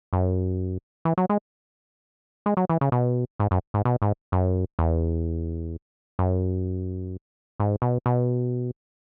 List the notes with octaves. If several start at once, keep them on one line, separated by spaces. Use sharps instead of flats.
F#2
E3
F#3
G#3
G#3
F#3
E3
C#3
B2
G#2
F#2
G#2
B2
G#2
F#2
E2
F#2
G#2
B2
B2